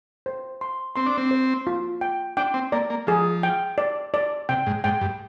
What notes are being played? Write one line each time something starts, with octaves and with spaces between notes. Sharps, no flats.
C5
C6
C4 C6
D4
C4
C5
F4
G5
D4 G5
C4
A#3 D5
A#3
F3 G#4
G5
D5
D5
C3 G5
G#2
G#2 G5
G2